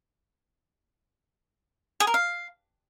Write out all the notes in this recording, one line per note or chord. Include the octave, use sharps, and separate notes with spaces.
G#4
A#4
F5